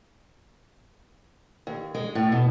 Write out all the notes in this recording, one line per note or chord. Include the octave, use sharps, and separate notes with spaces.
D#2
G#3
A2
B2